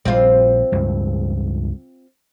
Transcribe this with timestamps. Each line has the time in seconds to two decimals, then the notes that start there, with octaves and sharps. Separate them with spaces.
0.05 A#1 F3 G3 C4 F4
0.72 C#2 G2